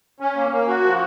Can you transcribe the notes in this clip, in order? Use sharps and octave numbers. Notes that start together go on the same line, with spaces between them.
C#4
A#3
A#3
F#4
F3